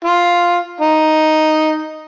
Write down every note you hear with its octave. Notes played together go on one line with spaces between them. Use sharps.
F4
D#4